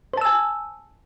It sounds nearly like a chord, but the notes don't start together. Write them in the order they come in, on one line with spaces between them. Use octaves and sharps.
C5 A5 E6 G#5